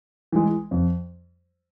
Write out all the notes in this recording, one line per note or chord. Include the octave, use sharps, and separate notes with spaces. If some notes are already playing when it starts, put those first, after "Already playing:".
E3 G#3
F2